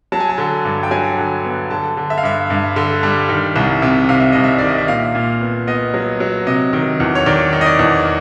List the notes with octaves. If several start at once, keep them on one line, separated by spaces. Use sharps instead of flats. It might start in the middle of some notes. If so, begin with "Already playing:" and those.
F#3 A5
G#5
A5
D3
G2
G5
F#3 G#5
D3
B3
D3 A5
D3
E5
F5
G2 E5
G2
D3
G3
D#3
C2
C3
C3 F5
E5
C2 D#5
E5
D#3 D5
D#5
E5
A#2 F5
A#2
B3
B3 D#5
F#3
F#3
C3 D#5
D#3
E2
C#5
D#3 D5
D#3
D#5
D5
E2